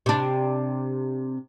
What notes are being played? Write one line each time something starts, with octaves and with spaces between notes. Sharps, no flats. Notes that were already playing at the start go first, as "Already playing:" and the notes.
C3 D4